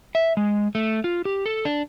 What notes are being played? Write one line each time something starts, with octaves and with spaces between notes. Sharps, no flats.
E5
G#3
A3
F4
G4
A4
D4